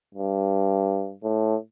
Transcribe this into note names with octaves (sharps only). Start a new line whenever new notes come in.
G2
A2